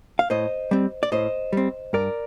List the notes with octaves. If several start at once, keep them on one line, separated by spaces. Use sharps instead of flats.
F5
A2 C5 D#5
G3 C4
D5
A2 C5 D#5
G3 C4
G2 A#4 D5